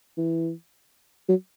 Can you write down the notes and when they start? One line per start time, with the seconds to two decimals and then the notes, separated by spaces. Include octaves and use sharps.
0.18 E3
1.29 F#3